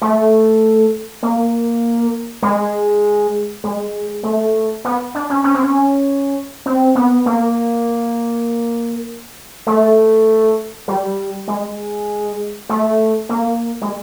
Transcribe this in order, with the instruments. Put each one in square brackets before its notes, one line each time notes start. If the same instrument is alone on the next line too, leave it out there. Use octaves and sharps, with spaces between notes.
[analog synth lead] A3
A#3
G#3
G#3
A3
B3
D4
C#4
C#4
C4
C#4
C4
B3
A#3
A3
G3
G#3
A3
A#3
G#3